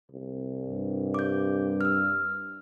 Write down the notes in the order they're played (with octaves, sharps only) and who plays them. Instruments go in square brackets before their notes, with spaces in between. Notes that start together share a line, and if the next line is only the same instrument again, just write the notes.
[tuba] C2
[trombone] G2
[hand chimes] D6 G6
E6 F6